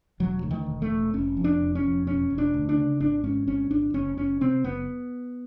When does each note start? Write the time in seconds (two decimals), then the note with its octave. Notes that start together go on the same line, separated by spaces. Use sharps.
0.20 E1 F#3
0.43 D2
0.51 D#3
0.66 E1
0.82 A3
0.90 E1
1.13 F1 C#4
1.37 F2
1.44 D4
1.60 F1
1.75 C#4
1.84 F2
2.07 E1 C#4
2.30 E1
2.38 D4
2.54 D2
2.69 D4
2.77 C#3
3.00 G#1 D4
3.24 G#2 C#4
3.47 G#1 C#4
3.71 G#1 D4
3.94 F#1 C#4
4.17 F#1 C#4
4.41 C3 C4
4.64 F#1 B3